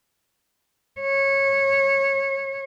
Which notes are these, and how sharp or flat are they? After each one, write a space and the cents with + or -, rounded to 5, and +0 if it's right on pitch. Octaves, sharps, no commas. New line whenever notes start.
C#5 -20